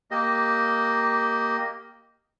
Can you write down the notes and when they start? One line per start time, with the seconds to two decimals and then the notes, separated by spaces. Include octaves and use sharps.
0.11 A#3 G4 D#5